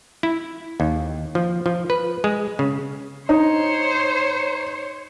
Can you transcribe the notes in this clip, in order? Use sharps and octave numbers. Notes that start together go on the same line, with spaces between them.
E4
D#2
F3
F3
B4
G#3
C#3
D#4 C5 C#5